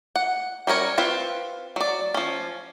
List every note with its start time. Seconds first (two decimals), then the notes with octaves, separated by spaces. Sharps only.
0.16 F#5
0.67 G3 C#4 A#4 C#5
0.98 C4 F4 B4
1.76 F#3 D5
2.14 F3 C#4